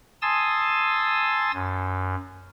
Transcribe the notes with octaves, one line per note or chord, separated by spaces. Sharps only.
G#5 A5 C6 D#6 E6 A6
F#2